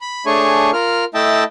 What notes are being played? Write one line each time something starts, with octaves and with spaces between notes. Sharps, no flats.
B5
A3 D4 G#4 C#5 G#5 C#6
F4 A#4 F6
A3 E4 D#5 E5 G5 A5